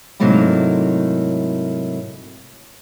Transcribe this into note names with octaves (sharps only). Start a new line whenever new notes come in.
G#2 C3 F#3 A3 A#3 E4